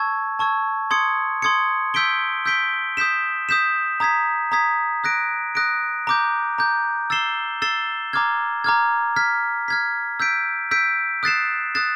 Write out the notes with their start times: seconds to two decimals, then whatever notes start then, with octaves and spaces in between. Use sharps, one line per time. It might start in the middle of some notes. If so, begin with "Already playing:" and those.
Already playing: A5 C#6 E6 G#6
0.39 A5 C#6 E6 G#6
0.91 C6 D#6 G#6 C#7
1.42 C6 D#6 G#6 C#7
1.94 E6 G6 B6 D7 G7
2.46 E6 G6 B6 D7 G7
2.97 D#6 G6 B6 E7
3.49 D#6 G6 B6 E7
4.00 A#5 D#6 G#6 B6
4.52 A#5 D#6 G#6 B6
5.04 D#6 F#6 A#6 D7
5.55 D#6 F#6 A#6 D7
6.07 A#5 D6 G6
6.58 A#5 D6 G6
7.10 E6 A6 C7 E7 G7
7.62 E6 A6 C7 E7 G7
8.13 A#5 D6 F6 G#6
8.64 A#5 D6 F6 G#6
9.16 F6 G#6 B6
9.68 F6 G#6 B6
10.20 E6 G6 B6 D7
10.71 E6 G6 B6 D7
11.23 D#6 F#6 A6 C7 E7
11.75 D#6 F#6 A6 C7 E7